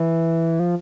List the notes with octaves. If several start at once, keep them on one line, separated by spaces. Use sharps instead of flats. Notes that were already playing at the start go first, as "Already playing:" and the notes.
Already playing: E3
F3